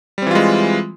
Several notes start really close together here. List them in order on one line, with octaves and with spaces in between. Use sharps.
G3 C4 E3 F4 G#3